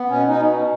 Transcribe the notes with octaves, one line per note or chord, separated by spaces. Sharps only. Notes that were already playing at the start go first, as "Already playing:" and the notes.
Already playing: B3
B2 C#4
B2 D#4